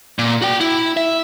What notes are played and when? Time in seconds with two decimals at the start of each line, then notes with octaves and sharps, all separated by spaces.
0.19 A#2
0.42 F#4 G5
0.61 E4
0.97 E5